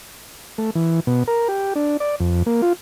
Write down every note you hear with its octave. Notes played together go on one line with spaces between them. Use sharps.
A3
E3
B2
A#4
G4
D4
D5
F2
A#3
F4